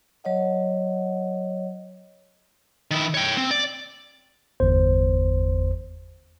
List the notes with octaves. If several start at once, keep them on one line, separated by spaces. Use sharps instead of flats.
F#3 C#5 D#5 F#5
D#3 E4
C#5 G5
C4
D5
G1 E2 C5